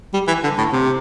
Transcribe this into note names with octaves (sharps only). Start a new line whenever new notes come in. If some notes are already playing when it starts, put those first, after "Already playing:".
G3
E3
D3
A2
C3